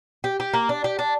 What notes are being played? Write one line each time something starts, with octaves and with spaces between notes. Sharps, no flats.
G4
G4
A#3
D4
G4
D4